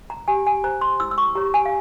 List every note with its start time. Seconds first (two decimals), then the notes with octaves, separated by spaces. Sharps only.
0.10 A#5
0.28 G4 G#5
0.46 G#5
0.64 C5 A#5
0.81 C6
1.00 E4 E6
1.11 E6
1.18 C#6
1.35 G4 C#5 A#5
1.54 G#5
1.65 F5